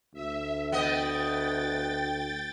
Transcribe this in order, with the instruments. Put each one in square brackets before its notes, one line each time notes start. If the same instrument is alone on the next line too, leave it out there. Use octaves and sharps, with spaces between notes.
[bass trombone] D2 [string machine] E5
[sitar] B3 D#5 [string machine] G5 A6